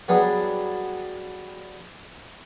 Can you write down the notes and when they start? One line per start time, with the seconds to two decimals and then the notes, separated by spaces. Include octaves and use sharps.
0.08 F#3 G3 B3 D4 G#4